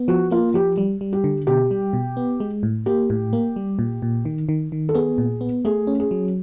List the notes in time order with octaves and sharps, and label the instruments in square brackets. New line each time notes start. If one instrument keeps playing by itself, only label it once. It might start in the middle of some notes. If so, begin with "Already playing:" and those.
Already playing: [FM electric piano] B3
[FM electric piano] F3 [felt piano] F#4
[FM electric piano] A#3 [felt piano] F4
[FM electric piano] F3 [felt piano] G4
[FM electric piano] G3
G3
[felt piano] G4
[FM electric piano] D3
[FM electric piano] B2 [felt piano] G4
[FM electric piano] G3
B2
B3
G#3
A2
[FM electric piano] A#3 [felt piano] G4
[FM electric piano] A2
A#3
G3
A#2
A#2
D#3
D#3
D#3
[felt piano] A4
[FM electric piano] B3 [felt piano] G#4
[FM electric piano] A#2
B3
[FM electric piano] A3 [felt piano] G#4
[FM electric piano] C#4
[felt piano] G#4
[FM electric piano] F#3